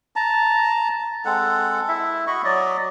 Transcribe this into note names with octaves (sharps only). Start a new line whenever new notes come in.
A5 A#5
G#3 C4 A4 F#5
E4 E5
F#4 D#5 B5 C#6
F#3 D5 D#5